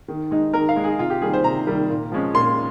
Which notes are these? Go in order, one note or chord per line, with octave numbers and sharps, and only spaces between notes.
D#3
G#3 D#4
D#3 A#4
F5
G#3 D#4
G#4
C3 F4
G4
D#3 G3 A#3 G#4
C5
C3 A#5
D#3 G3 A#3
A#2
F3 G#3 C#4
A#2 C6